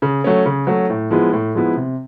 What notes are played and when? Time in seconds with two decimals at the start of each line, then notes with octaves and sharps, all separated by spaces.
0.02 C#3
0.24 F#3 A3 C#4
0.46 C#3
0.67 F#3 A3 C#4
0.90 A2
1.10 F3 G#3 B3 E4
1.33 A2
1.55 F3 G#3 B3 E4
1.76 C3